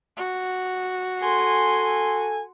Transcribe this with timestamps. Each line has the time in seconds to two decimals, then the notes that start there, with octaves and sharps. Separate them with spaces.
0.17 F#4
1.22 A4 G#5 C6